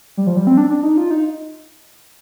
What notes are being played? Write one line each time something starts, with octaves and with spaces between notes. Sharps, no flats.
G3
F3
G3
C4
D4
D4
D#4
F4
D#4